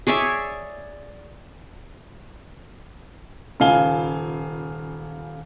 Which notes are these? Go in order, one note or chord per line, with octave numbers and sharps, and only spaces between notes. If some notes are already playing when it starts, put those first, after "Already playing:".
G#4 C#5 D5 E5
D#1 C#3 F4 F5 G#5 G7